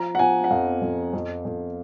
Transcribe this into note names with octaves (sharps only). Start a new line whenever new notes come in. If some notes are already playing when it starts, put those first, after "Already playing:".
Already playing: F3 A#5
F#5
F3 G#5
F#5
F2 F5
F2
F2
F2